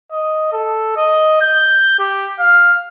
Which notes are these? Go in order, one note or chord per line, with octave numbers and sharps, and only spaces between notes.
D#5
A4
D#5
G6
G4
F5